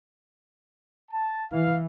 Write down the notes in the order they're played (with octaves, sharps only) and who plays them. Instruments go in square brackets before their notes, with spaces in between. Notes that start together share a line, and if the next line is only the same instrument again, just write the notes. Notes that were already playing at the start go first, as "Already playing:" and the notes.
[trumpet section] A5
[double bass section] E3 [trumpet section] F5